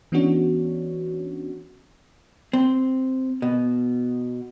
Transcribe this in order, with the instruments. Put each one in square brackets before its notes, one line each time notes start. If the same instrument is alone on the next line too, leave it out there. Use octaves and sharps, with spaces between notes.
[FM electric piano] E3 B3 C#4 D4 F#4 C#5
[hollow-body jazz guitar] C4
B2